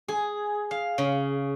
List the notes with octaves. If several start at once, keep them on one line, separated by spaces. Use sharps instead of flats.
G#4
F5
C#3